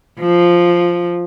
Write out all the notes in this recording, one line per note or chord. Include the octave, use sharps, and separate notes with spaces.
F3